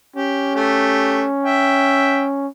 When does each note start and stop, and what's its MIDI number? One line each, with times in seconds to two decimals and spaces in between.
0.16 2.48 61
0.16 0.51 67
0.55 1.24 57
0.55 1.24 67
1.45 2.26 76
1.45 2.26 79